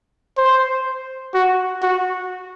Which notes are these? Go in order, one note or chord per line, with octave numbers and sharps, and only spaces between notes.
C5
F#4
F#4